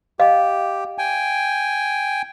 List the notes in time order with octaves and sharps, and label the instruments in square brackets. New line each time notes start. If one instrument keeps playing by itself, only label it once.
[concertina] G4 [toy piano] D#5 F5
[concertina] G5 G#5